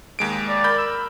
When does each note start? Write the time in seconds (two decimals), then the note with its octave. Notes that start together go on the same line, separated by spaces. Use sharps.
0.19 D#2 G#3 D7
0.49 D5
0.64 A#4 B5 G6
0.78 E6